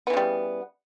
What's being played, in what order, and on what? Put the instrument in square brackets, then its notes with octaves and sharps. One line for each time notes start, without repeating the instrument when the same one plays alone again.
[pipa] B3
E3
C#3
G3